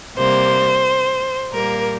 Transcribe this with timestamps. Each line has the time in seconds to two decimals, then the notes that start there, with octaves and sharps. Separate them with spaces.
0.17 C3 G3 A#3 C5
1.51 A#2 G3 A#3 A#4